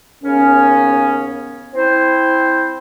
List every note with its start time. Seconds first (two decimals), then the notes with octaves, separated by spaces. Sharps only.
0.23 D#2 C#3 B3 C#4
1.75 C4 E4 C5